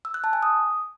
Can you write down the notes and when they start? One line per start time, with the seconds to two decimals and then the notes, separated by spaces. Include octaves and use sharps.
0.05 E6
0.14 F#6
0.24 A5
0.33 G#5
0.43 D#6